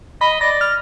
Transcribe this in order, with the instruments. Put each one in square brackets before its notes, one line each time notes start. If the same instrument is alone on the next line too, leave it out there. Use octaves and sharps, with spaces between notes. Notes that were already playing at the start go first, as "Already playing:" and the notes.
[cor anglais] D#5 [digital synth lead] B5
[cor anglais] D5 [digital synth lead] A#6
[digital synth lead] F6